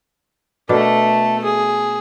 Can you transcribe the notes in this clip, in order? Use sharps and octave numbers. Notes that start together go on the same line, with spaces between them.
B2 A3 D4 A4 A#4
G#4